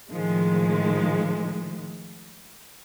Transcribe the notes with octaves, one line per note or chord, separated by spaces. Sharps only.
A2 D#3 F3 G#3